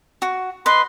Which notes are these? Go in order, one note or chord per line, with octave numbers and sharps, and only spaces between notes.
F#4
B4 D#5 C6